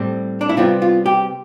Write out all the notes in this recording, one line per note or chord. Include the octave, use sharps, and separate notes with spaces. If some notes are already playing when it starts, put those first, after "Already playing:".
Already playing: A2 G3 C4
D4
E4
C3 G3 B3 F4
F4
G4